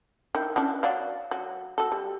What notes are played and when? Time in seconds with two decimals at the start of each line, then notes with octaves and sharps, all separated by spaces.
0.35 D#3 E4
0.56 E3 C#4 D4
0.83 F#3 D5 F5
1.31 F#3
1.78 F#4 A4
1.92 G3